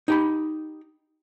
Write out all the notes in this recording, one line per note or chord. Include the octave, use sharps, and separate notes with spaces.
D#4 G4 B5